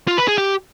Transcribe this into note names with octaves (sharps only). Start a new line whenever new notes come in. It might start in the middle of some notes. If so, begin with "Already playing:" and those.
F4
B4
G#4
G4